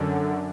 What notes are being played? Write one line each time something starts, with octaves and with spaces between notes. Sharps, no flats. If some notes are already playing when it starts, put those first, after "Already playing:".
Already playing: F#2 D3